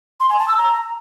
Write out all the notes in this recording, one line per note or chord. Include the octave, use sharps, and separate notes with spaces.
C6
G#5
A5
E6
A#5